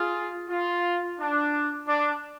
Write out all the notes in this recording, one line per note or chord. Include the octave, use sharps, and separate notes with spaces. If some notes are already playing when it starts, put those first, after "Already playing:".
Already playing: F4 G#4
F4
D4
D4